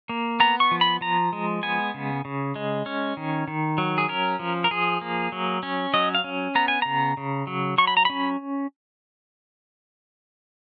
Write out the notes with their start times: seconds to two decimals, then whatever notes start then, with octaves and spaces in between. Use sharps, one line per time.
0.09 A#3
0.40 B3 A#5
0.60 C#6
0.71 F3
0.81 B5
1.01 F3 A#5
1.33 G#3
1.63 B3 G#5
1.94 C#3
2.25 C#3
2.56 G#3
2.86 C#4
3.17 D#3
3.48 D#3
3.78 F#3
3.98 G#4
4.09 C#4 A#4
4.39 F3
4.64 A#4
4.71 F3 G#4
5.01 A#3
5.32 F#3
5.63 C#4
5.94 F#3 D#5
6.15 F5
6.24 C#4
6.55 B3 A#5
6.68 G#5
6.82 C#3 A#5
7.17 C#3
7.47 F#3
7.78 F#3 C#6
7.87 B5
7.97 A#5
8.05 C#4 B5